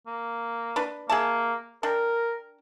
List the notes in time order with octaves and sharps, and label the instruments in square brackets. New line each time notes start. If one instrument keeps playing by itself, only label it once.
[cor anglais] A#3
[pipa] D4 B4
[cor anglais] A#3 [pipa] G#4 E5 A5
[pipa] D4 G5 [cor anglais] A#4